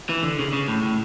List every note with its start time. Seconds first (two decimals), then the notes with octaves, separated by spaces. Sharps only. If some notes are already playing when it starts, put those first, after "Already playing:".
0.09 E3
0.23 D3
0.39 C#3
0.53 C#3
0.68 A2
0.83 A2